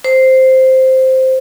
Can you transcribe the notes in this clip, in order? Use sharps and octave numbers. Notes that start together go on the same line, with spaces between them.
C5